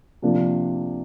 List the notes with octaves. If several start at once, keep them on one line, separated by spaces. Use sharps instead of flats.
C3 F3 A#3 D4